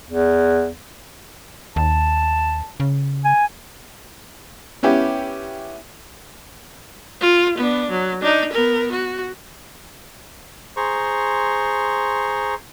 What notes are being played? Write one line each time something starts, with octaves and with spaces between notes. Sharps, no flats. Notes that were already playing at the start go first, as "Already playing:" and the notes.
E2
D#2 A5
C#3
G#5
B3 C#4 E4 G4
F4
B3 D4
F#3
D4 D#4
B3 A#4
F#4
G#4 C5 A#5 C6 C#6